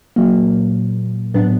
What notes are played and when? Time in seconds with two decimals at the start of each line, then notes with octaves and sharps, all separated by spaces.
0.16 A#2 F#3 A#3
1.34 A2 F#3 B3 D4